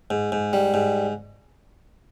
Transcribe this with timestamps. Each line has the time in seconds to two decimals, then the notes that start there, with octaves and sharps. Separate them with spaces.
0.10 G#2
0.32 G#2
0.53 G3
0.74 G#2